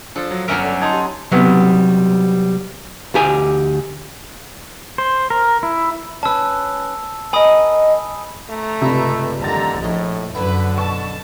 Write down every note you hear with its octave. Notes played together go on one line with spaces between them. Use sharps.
F3 D4 A4
F#3
G1 F#3 C#4 A#4 E5 D7
D3
D#4 A5 C6 G#6
G4
C3 F#3 G3 B3
D2 G4 G#5
C5
A#4
E4
C#4 B4 A5 E6
A#4 D#5 G#5 B5 D#6
A3 A#5
C#2 G2 C3 E4
A1 D#2 D3 C4 A#5 A6
A#1 A2 C#5 D#5
F#2 D3 B3 E4 B4
B2 A5 C#6